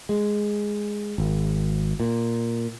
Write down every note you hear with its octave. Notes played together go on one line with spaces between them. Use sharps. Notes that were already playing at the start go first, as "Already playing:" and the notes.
G#3
G#1
A#2